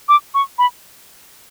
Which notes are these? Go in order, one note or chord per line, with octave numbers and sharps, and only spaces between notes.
D6
C#6
B5